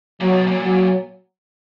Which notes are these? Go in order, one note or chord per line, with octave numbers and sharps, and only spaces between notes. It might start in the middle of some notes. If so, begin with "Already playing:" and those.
A#2 F#3
B2
A#2
F#3